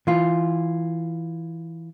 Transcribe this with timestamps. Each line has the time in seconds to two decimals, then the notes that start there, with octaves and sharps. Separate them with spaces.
0.07 E3 F4